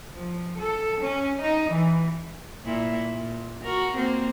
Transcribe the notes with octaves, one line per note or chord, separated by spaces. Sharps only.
F3
A4
C#4
D#4
E3
A#2 E4
A#2
F#4 A#4
A#3 C4